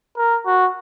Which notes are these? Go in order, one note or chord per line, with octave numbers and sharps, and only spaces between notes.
A#4
F#4